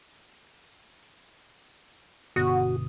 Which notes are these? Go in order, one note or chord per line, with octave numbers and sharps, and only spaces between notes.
G1 B2 F#4 D#6